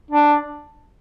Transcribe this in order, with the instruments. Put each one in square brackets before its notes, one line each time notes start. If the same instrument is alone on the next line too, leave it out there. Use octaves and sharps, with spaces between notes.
[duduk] D4